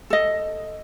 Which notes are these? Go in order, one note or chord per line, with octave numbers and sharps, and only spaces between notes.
A4 D#5